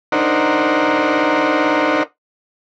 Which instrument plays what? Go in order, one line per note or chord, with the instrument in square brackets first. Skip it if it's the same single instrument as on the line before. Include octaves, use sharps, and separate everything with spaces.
[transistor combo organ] D4 D#4 A#4 C5 F#5